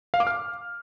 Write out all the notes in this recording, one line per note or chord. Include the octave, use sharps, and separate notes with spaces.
F5
D6
F6